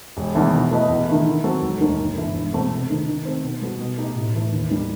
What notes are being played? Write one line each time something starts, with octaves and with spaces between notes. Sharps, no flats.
E1
E2 D#3 A3 E4
B2
A3 E4 B4 D#5
E2
D#3 A3 E4
D#3
F#3 C4 F#4 A4
E1
D#2 D#3 A3
G1
G2 E3 A3 E4
E1
E2 B2 A3 C4
C3
D#3 A3 C4 D#4
D#3
A3 C4
B2
G3 B3 F#4 A4
B2
A3 D#4 G4
A2
E3 A3 E4 B4
D#2
D#3 G3 B3